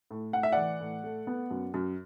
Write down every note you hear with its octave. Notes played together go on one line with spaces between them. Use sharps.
A2
A2 F#5
E5
E3 D5 F#5
A2
A3
B3
F#2
F#2